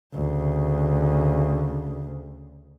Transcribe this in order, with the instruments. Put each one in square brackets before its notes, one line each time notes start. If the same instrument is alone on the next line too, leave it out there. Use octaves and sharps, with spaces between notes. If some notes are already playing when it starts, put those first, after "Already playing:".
[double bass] D2 C#3